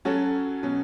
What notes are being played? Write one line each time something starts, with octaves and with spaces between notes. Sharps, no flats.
F#3 C#4 F#4 A4
B2 F#3 C#4